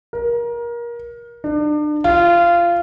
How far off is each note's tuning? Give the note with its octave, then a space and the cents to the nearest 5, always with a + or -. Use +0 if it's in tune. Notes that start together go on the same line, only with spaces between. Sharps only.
A#4 +25
D4 +35
F4 -20